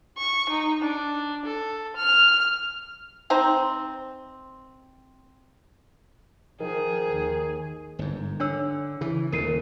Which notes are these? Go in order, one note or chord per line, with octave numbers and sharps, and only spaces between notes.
C#6
D#4
D4
A4
F6
C4 D#4 C5 A#5
D#3 F3 G#4
D#2
G1 G#2
D3 D4 C#5 E6
C#3 E3
D#1 D2 C#3 A#4 C7 D#7